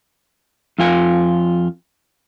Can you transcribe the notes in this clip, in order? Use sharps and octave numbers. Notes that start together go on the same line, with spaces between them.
F2 F4 G#5